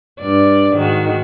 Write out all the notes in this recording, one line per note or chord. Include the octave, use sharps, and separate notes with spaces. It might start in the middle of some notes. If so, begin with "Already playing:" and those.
G2 D5
G#2 D#3 F#4